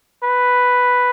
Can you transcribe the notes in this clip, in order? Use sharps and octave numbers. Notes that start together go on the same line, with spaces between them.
B4